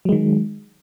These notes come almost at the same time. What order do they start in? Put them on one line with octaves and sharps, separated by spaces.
F#3 G#3 D#3